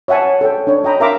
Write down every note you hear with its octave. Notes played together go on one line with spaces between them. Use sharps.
C#5 E5 F#5 G#5 A5
A4 C#5 G5
D4 C#5
D#5 G5 A#5 B5
A#4 E5 F5 A#5 C6 D6